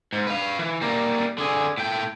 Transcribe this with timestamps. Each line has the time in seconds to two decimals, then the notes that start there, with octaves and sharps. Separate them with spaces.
0.13 G#2
0.27 B4 F5
0.59 E3
0.81 G3 A#3
1.38 D3 G#4
1.77 A2 G5